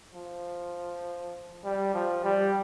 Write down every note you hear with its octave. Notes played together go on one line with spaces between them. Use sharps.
F3
G3
F3
G3